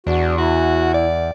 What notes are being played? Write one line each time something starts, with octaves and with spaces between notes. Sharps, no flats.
E2 D4 F#4
E4 F#4
D5